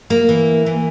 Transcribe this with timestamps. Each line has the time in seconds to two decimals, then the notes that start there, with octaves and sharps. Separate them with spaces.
0.10 A#3
0.29 E3
0.66 E3